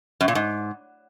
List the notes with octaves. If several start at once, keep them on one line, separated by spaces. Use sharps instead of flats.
F#2
A#2
G#2